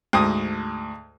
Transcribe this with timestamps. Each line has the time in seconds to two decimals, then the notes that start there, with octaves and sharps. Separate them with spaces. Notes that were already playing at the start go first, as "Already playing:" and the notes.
0.13 D2 G#2 D#6